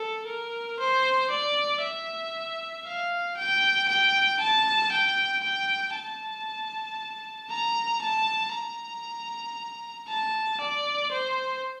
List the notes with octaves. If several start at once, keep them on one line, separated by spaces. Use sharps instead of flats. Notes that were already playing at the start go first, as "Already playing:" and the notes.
Already playing: A4
A#4
C5
D5
E5
F5
G5
G5
A5
G5
G5
A5
A#5
A5
A#5
A5
D5
C5